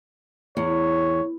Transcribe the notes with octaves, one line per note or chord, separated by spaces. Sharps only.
E2 C#5